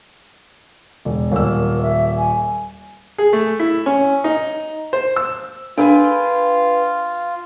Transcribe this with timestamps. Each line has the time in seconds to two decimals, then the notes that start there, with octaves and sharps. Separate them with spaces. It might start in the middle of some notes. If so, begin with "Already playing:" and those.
1.05 E1
1.32 D#1 A#4 E6
1.82 E5
2.17 G#5
3.18 G#4
3.33 A3
3.60 E4
3.86 C#4
4.24 D#4
4.93 C5
5.16 E6
5.78 D4 F4 G#4 A#4 B4 G5 B5